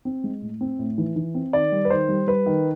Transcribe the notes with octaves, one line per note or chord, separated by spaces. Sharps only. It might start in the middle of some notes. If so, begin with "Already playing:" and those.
C4
G#3
A2
C4
A2
E3
E3
C4
D#3 D5
G3
B4
D#3 C5
G3
G3 B4
D#3